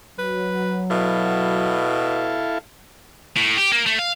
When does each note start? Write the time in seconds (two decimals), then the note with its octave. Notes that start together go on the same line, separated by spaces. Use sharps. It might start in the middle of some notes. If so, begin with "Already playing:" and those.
0.18 F#3 B4
0.90 B2 E4 A4 F5
3.37 A2
3.58 G4
3.72 A#3
3.86 A3
3.99 F5